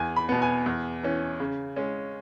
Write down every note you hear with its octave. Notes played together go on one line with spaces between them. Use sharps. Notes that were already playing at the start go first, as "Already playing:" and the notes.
Already playing: E2 G#5
B5
B2 B3
G#5
E2
E3 C#4
C#3
G#3 C#4